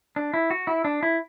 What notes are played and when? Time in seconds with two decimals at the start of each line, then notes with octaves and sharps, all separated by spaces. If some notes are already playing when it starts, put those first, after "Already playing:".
0.16 D4
0.34 E4
0.50 F#4
0.67 E4
0.85 D4
1.03 E4